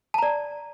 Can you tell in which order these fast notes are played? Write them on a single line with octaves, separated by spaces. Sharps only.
A5 A#5 D5